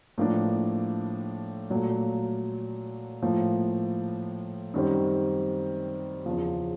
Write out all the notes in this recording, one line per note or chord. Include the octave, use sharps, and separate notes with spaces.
A2 F3 A#3 D4
A#2 F#3 A3
A2 F3 A#3
F#2 D#3 G3 C4
E2 C#3 F3